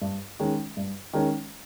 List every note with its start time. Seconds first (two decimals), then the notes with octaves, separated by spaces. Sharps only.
0.02 G2
0.40 D#3 G#3 C#4
0.77 G2
1.13 D#3 G#3 C#4